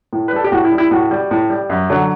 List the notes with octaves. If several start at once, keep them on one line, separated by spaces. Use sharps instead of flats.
A2
B4
G3 A4
G4
A2 F#4
E4
G3
E4
A2 F#4
G3
A2
G3
F#2
D3 F#3